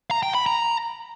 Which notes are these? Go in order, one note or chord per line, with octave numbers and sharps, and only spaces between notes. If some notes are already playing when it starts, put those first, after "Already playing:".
A#5
G5
B5
A#5